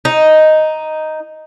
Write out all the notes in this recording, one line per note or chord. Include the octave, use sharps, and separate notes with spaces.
D#4